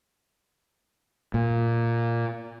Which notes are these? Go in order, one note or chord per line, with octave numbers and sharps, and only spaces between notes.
A#2